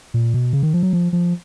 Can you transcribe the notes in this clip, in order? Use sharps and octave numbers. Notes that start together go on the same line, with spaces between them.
A#2
B2
C#3
D#3
F3
F#3
F3
F3